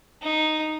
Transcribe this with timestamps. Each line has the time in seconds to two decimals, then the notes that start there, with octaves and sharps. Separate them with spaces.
0.23 D#4